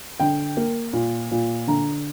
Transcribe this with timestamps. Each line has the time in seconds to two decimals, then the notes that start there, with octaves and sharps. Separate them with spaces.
0.20 D3 G5
0.57 A#3
0.93 A#2
1.31 A#2
1.67 D3 A#5